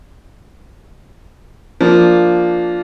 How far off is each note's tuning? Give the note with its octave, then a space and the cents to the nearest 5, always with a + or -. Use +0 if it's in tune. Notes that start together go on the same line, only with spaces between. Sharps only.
F3 +0 A#3 +0 D4 +0